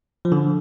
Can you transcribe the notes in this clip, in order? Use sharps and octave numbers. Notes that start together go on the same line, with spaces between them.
F3
D3